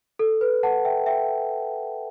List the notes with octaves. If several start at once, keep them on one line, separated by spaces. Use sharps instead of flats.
A4
B4
F#5 A5
E5 G5
E5 G5